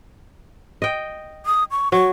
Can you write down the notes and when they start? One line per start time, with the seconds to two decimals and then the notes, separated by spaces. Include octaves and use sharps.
0.82 D#5 G5
1.46 D#6
1.71 C#6
1.92 F#3 C#6